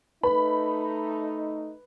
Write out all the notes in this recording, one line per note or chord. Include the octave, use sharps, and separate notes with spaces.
A3 D#4 B4 B5